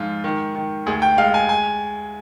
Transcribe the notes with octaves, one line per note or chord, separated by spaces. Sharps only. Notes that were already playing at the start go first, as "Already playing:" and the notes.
Already playing: G#2 F3 F4
D#3
D#3
D2 G#4
G5
G#3 F5
G#5
G#5